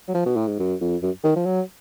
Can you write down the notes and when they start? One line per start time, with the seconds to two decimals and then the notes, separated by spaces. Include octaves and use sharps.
0.08 F#3
0.14 F3
0.26 B2
0.36 A2
0.47 G#2
0.59 F#2
0.81 F2
1.02 F#2
1.24 D#3
1.36 F3
1.46 F#3